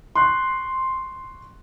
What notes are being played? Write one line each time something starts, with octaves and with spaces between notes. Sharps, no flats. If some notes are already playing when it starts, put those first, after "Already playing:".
C6 C#6 F#6